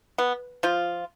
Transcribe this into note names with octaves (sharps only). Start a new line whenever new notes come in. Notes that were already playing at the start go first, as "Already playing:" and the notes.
B3
F3 F4